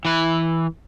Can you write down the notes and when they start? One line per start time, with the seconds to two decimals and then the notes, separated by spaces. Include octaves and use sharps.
0.05 E3 B4